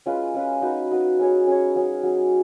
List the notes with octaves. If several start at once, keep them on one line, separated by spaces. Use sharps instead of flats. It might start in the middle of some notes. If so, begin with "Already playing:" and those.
G#3 C#4 F4 B4
G#3 C#4 F4 B4
D#4 F#4 B4
D#4 F#4 B4
C#4 G#4 C#5
C#4 G#4 C#5
F#3 C#4 G#4
F#3 C#4 G#4